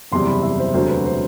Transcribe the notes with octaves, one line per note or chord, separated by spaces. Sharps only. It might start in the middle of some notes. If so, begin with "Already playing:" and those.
F#1 E2 C3 G3 C6
B5
E5
C5
E1 D2 C3 F#3 C5
B4
C5